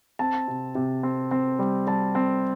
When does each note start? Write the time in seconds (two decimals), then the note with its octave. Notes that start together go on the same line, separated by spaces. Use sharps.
0.19 C4 A5
0.48 C3
0.75 C3
1.03 C4
1.31 C4
1.59 G3
1.87 G3 A5
2.15 C4